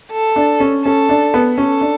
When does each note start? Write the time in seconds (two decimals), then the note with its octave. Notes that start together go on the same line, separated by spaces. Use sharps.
0.12 A4
0.36 D4
0.60 C#4
0.86 C#4 A4
1.09 D4
1.34 B3
1.58 C#4 A4
1.81 D4